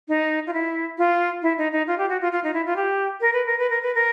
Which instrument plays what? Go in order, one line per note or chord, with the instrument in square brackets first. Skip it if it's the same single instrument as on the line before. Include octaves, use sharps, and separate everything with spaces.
[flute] D#4
F4
E4
F4
E4
D#4
D#4
F4
G4
F#4
F4
F4
D#4
E4
F4
G4
A#4
B4
A#4
B4
A#4
B4
A#4